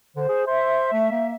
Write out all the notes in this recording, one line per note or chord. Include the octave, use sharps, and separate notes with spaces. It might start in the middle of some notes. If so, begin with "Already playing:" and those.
D3 C5
G#4
C5 E5
A3
A#3